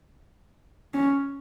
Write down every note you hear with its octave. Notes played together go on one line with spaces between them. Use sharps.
C#4